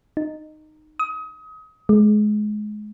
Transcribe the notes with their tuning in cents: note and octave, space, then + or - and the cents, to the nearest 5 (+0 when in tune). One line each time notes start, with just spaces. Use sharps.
D#4 -15
D#6 +30
G#3 +25